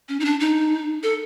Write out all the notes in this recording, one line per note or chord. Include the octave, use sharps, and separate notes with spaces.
C#4
D#4
D4
D#4
A4